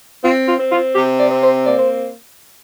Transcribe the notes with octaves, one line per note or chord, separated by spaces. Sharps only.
C4 F4
F4
C4
F4
C3 G4
D5
C4
C5
A#3 D5
C5